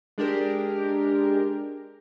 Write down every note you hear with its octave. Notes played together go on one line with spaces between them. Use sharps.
G#3 D4 G4 A#4